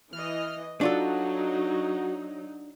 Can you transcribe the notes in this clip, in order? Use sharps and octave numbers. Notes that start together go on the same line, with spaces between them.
E3 D#5 F6
F#3 D4 D#4 F4 F#4 A4